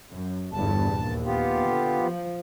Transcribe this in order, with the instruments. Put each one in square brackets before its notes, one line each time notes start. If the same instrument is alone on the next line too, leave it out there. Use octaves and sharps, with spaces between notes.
[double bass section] F#2
[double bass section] G1 E2 G2 [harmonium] A5
[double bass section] A#1 D#2
[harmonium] B3 F4 G4
[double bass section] D3
F3